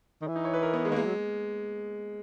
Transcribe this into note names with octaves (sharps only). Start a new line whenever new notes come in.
D#3
E3
D#4
C#5
B4
A#4
B3
G#3
D#3 A#3
E3 G#3
F#3